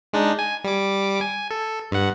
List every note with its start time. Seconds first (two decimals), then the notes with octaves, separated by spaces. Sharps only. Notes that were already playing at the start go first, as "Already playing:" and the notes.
0.13 G#3 D4 D#4
0.39 G#5
0.64 G3 D6
1.21 G#5
1.51 A4
1.91 G2 F#5